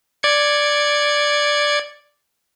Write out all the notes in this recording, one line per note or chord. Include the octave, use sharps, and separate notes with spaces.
D5 G#6 C#7